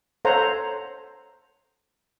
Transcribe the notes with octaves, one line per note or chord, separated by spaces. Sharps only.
A4 C5 C#5 F#5 A#5